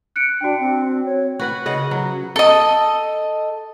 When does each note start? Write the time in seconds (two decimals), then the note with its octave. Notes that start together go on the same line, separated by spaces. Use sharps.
0.16 F#6 C#7 D7
0.41 D4 F#4 G5
0.59 C4
1.05 C#5
1.39 F#4 B4 F#5
1.66 C#3 D#5 F#5
1.91 F#3
2.36 A4 D#5